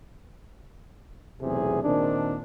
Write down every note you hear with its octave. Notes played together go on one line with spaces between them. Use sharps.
B1 E2 A2 C3 G#4
A#2 D#3 C4 D4